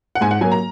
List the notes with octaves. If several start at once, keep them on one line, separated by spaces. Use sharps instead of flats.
F#5
G#2 G#5
F#5
F#3 A#3 G#5
A#5